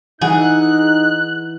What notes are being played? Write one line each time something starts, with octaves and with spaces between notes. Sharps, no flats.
E3 D#4 G#4 F#5 F#6